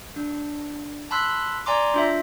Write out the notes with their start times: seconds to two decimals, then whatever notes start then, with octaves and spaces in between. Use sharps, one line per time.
0.16 D4
1.11 A5 B5 C6 E6 F#6 B6
1.66 D5 G#5 A#5 C6 D6
1.94 D4 F4 E5